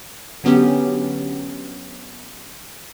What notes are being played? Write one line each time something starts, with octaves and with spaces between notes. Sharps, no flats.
D3 F#3 B3 C#4 G4